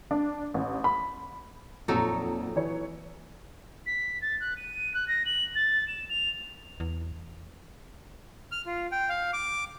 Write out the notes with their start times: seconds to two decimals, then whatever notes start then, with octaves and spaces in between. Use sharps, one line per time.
0.11 D4
0.54 A1
0.84 B5
1.88 A#1 F2 A#2 F#3 D#4 A4
2.56 E3 C#5
3.86 B6
4.21 A6
4.40 F#6
4.57 D#7
4.94 F#6
5.08 A#6
5.25 F#7
5.55 A6
5.87 E7
6.09 F7
6.80 E2
8.52 F6
8.66 F4
8.92 G5
9.09 F5
9.33 D6